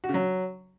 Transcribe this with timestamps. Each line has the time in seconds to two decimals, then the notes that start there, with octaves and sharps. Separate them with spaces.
0.04 F#4
0.09 C#3
0.14 F#3